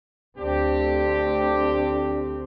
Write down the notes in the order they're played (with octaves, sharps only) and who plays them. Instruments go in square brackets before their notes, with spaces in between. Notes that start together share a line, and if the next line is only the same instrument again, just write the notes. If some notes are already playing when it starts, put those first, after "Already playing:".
[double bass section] D2 A3 C4 [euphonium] D4 [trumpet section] G4